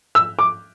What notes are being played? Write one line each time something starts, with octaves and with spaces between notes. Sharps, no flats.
E6
D6